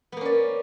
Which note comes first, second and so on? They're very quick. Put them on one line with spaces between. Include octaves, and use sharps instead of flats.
B3 A#3 C#4 D5